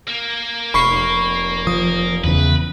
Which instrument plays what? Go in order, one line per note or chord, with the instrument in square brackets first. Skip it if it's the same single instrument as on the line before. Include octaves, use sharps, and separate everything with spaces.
[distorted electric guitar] A#3
[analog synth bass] F1 [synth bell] B5 C#6 C7
[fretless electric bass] F3 [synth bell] D#6
[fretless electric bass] E2 C#3 [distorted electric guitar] B4